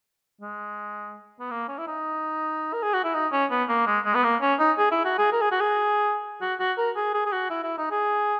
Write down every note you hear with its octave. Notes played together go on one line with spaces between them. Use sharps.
G#3
B3
A#3
C#4
E4
D#4
A#4
G#4
F#4
E4
D#4
C#4
B3
A#3
G#3
G#3
B3
A#3
C#4
D#4
G#4
E4
F#4
G#4
A#4
G#4
F#4
G#4
F#4
F#4
A#4
G#4
G#4
G#4
F#4
E4
E4
D#4
G#4